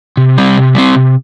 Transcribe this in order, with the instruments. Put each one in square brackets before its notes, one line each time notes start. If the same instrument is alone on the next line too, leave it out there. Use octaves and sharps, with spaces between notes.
[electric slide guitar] C3
G3 C4
C3
G3 C4
C3